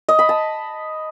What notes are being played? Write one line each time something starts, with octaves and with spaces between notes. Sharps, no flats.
D#5
B5
A5